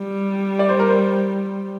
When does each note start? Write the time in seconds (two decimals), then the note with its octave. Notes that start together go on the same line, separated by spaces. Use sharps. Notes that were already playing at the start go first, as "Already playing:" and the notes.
Already playing: G3
0.59 D5
0.69 C5
0.79 A#4
0.89 C5